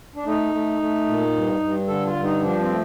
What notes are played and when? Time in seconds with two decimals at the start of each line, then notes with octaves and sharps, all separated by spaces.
0.16 D4
0.25 A3 D#4
0.51 A3
0.79 A3
1.06 A#2
1.33 G2
1.60 G2
1.87 D3 A4
2.06 F4
2.14 G2
2.23 D#4
2.41 F3 D4
2.60 C4
2.69 A3